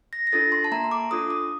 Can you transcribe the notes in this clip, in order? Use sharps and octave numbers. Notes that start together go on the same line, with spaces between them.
A#6
A#6
D4 F4 A4 A6
C6
A5
A#3 A#5
C6
D6
D4 F4 A4 D#6
D#6